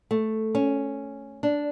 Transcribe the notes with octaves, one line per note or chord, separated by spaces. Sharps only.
A3
C#4
D4